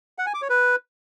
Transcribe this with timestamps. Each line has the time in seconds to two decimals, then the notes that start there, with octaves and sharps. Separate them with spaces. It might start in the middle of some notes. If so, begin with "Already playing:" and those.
0.18 F#5
0.26 G#5
0.34 D6
0.42 C#5
0.50 B4